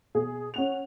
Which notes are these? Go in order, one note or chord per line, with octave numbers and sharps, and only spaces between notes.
B2 G#4
C#4 F#5 F7